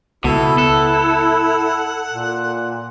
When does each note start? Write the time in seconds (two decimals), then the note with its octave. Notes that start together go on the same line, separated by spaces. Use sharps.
0.24 C#2 B2 E4 A4
0.58 A4 F#5
2.08 A#2